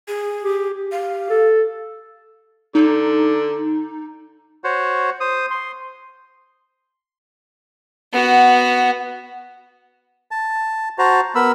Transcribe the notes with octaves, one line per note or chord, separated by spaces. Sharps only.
G#4
G4
G4
F5
A4
D3 D#4
F#4 C5 C#5
C5 D#6
C6
B3 F#4
A5
F#4 C5 A5 A#5
B3 A#4 B5 E6